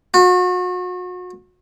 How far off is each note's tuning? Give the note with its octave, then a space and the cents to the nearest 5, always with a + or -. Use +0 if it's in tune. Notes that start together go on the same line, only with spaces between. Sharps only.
F#4 -35